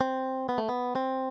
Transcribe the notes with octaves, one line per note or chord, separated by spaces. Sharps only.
C4
B3
A3
B3
C4